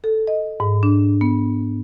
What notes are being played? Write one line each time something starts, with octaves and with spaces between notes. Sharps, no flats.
A4
D#5
G#2
D4
B3